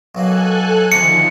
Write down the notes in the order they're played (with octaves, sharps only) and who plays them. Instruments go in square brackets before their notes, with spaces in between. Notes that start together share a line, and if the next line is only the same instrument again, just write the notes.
[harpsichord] B1 F#3 A#3 [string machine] A4 G#5 F#6
[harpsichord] D2 C3 A#5 [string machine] D#3 F3 [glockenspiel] C#7